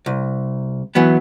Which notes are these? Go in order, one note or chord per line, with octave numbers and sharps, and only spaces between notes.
C2
E3 F#3 B3